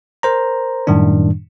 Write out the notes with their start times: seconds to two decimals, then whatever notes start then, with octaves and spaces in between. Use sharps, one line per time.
0.23 A#4 C5 A#5
0.87 F#2 A2 D#3 G3 D4